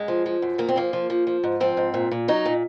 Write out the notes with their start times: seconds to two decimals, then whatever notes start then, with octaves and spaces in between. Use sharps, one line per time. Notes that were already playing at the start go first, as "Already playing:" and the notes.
Already playing: F#2 G#3
0.08 F3
0.26 F3
0.42 F#2
0.58 A#2 A#3
0.69 C4
0.76 F3 A#3
0.93 F3
1.10 F3
1.27 F3
1.44 G#2
1.60 F3 C4
1.77 G#2
1.94 A#2
2.11 A#2
2.28 F#3 D#4
2.45 A#2